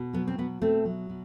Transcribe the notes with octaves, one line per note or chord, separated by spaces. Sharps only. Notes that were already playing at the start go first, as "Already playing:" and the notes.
Already playing: B2
F#3 B3
C4
B2 B3
B2 A3 C4
F#3
B2